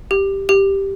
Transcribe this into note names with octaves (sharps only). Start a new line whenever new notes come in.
G4
G4